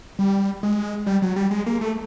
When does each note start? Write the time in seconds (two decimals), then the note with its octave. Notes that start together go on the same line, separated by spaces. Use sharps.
0.19 G3
0.63 G#3
1.07 G3
1.22 F#3
1.36 G3
1.51 G#3
1.66 A#3
1.81 A3